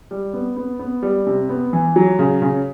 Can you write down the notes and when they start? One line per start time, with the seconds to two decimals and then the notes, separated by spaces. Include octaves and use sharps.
0.11 G3
0.33 B3
0.57 B3
0.79 B3
1.02 G3
1.27 C3
1.49 B3
1.73 E3
1.96 F#3
2.19 C#3
2.42 C#3